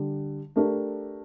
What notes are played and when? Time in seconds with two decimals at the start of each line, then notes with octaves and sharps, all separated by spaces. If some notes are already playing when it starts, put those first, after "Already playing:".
Already playing: D3 G3
0.56 A3 D4 G4 A#4